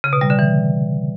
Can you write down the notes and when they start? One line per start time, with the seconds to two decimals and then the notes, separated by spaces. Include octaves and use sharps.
0.04 C#3
0.13 B2
0.21 G3
0.30 D3
0.39 E3